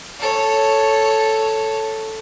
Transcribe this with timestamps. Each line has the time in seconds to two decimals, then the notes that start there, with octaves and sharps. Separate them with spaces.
0.19 A4 C#5